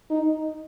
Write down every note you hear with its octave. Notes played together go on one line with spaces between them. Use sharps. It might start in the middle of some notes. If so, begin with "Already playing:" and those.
D#4